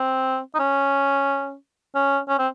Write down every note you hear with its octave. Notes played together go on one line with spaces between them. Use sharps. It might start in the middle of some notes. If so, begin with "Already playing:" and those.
Already playing: C4
D#4
C#4
C#4
C#4
C4